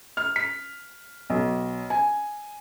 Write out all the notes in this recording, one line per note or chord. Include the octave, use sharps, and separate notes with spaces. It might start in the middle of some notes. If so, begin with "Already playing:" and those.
F6
B6
B1
G#5